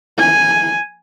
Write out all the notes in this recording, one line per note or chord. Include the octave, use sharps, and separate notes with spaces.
G#5